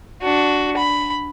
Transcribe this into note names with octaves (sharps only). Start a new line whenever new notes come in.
D4 F#4
B5